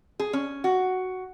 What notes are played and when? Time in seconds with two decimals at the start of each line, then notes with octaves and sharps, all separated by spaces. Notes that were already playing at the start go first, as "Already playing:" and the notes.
0.20 G#4
0.33 C#4
0.64 F#4